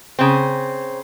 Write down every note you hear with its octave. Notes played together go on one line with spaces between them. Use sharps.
C#3 C4